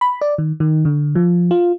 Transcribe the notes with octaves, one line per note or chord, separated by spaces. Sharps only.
B5
D5
D#3
D#3
D3
F3
F4